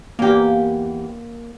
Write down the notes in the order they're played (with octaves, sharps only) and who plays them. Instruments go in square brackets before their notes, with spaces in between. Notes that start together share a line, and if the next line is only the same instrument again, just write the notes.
[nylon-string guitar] E2 G4 [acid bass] A#3